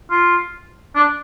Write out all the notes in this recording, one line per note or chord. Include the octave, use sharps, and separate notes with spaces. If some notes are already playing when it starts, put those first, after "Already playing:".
F4
D4